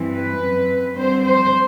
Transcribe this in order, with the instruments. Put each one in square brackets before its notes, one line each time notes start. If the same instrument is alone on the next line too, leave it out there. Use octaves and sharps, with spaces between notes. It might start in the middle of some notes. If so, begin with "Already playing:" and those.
Already playing: [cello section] G2 E3 G3 C4
B4
F#2 F#3 C4
D3 G3 C4 C5
C5